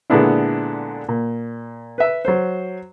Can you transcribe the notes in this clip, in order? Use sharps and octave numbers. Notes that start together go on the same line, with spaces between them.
A#2 D3 G#3 B3 D4 E4
A#2
B4 E5
F#3 C5